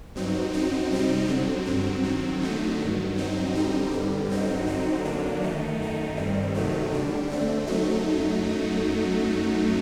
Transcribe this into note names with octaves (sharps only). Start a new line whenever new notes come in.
G2 F#3 C4 D#4
F#2 F#3 C4 D#4
C3 G3 C4 D#4
D3 F#3 C4
G2 F#3 C4
D#3 F#3 C4
D3 F#3 A3 D#4
G2 D#3 F#3
G2 F#3 C4 D#4
D3 G3 C4 D#4
G2 D3 G3
G2 F#3 C4 D#4
D3 F#3 C4 D#4
D3 F#3 A#3 D4
D#3 A3 D#4
F#2 D#3 A3 D#4
G2 D#3 G3 C4
C3 D#3 F#3 A3 D#4
D3 G3 D4
D3 A3 C4
F#2 F#3 A3 D#4